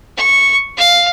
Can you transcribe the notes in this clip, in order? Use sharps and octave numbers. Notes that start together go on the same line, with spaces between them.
C#6
F5